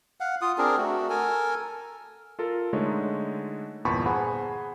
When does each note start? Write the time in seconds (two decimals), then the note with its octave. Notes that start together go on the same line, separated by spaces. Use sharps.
0.20 F5 F#5
0.42 F4 D#6
0.58 C4 D4 G#4 A#4
0.77 A3 F#4
1.10 A4 A#4 G#5
2.39 F4 A4 A#4
2.73 D3 G#3 A3 D#4 C#5
3.85 G1 E2 A#2 A5 B5 C#6
4.06 G#4 C5 F#5 G#5 B5